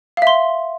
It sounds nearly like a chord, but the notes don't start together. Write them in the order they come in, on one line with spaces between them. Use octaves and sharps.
F5 E5 C6